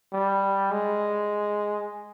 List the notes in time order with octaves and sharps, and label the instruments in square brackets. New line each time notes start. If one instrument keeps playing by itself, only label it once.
[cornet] G3
G#3